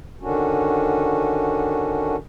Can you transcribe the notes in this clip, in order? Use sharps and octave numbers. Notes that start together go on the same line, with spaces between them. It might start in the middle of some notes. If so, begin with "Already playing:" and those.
D3 D#3 C#4 D4 F#4